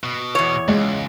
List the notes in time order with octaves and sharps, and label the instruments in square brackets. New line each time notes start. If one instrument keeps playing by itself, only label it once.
[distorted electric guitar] B2
[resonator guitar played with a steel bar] E2 C#5
[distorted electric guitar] C#2 [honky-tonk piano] G#3